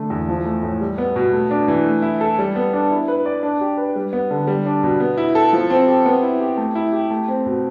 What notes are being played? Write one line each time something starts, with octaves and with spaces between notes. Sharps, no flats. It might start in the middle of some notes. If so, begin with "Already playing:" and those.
Already playing: D3 A3
E2
F3
A3
A2
G3
B3
B2
A3
D4
E3
A3
E4
A4
G3
B3
D4
E4
B4
D5
D4
G4
B4
G3
B3
D3
G3
D4
B2
B3
E4
A4
F3
C4
G4
B3
E4
G4
A3
E4
G4
A3
C4
B2